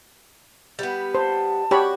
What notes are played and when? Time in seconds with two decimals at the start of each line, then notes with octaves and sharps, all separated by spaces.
0.79 G3 B3
1.15 C5 A5
1.71 F#4 G4 C#5 B5